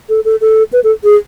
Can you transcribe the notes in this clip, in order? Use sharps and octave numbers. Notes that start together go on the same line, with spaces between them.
A4
A4
A4
B4
A4
G#4